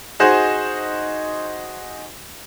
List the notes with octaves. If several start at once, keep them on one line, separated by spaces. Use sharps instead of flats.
D#4 F#4 G#4 C5 D#5